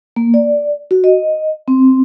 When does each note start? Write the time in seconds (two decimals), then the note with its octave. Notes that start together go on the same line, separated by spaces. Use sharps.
0.16 A#3
0.34 D5
0.91 F#4
1.04 D#5
1.68 C4